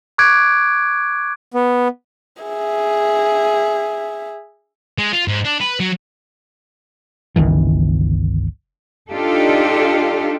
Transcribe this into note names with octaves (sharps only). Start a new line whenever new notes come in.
C#6 D6 F#6 G#6 D7
B3
G#4 E5
G#3
F4
G#2
D4
B4
F#3
G1 C#2 D#3 E3
D4 D#4 F4 G4 A4